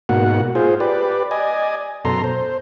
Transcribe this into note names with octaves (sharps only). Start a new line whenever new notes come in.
G#2 B2 A#3 F#4 F#5
F4 G#4 C5
G4 B4 D5
D5 D#5 G#5
F#2 B2 A4 A#5 C6
C5